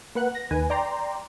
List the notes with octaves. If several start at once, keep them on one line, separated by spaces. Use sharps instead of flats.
A#3 B4 F#5 F#6
A#6
D#2 D#3 B4 G#5
D5 G5 A#5 C6